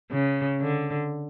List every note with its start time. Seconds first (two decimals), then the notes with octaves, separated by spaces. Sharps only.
0.11 C#3
0.60 D3